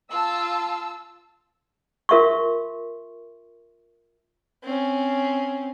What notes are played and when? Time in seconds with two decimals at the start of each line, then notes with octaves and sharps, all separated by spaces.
0.11 F4 A5 E6
2.09 F4 A#4 E5 C6 C#6
4.63 C4 C#4